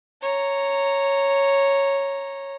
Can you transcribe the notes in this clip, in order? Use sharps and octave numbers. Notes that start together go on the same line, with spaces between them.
C#5 A#5